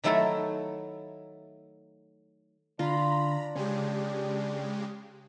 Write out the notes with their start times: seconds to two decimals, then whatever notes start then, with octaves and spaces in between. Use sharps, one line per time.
0.04 D#3 F#3 A3 E4 A4 A#4
2.79 D3 D4 F4 A#5 B5
3.55 C#3 G#3 G4 C#5 G#5